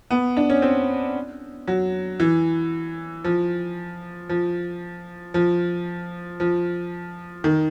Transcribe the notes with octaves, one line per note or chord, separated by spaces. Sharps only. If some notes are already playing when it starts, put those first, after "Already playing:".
B3
D4
C#4
C4
F#3
E3
F3
F3
F3
F3
D#3